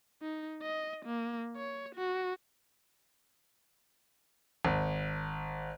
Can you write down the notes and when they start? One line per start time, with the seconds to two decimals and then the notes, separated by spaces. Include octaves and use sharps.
0.22 D#4
0.62 D#5
1.05 A#3
1.57 C#5
1.95 F#4
4.65 G#1